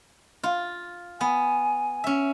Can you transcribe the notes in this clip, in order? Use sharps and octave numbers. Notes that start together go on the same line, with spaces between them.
F4
B3 G#5
C#4 E5